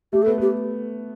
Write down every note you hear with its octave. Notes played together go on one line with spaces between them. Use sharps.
A3 G4
A4
B3
B3 G4